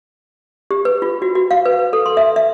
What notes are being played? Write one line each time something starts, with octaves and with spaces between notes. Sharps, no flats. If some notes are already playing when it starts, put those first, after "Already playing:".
G4
B4
F4
F#4
F#4
F5
B4
B4
A4
C6
E5
E5